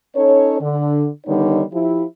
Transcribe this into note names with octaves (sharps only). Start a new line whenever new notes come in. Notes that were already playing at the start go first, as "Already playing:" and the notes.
C#4 D#4 A4 C#5
D3
D3 D#3 G3 B3 D#4 C#5
F3 E4 G4